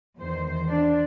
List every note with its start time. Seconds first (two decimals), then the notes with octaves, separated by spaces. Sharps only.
0.18 E2 D#3 C5
0.69 D4